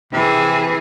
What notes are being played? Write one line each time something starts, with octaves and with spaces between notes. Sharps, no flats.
C3 E3 G#4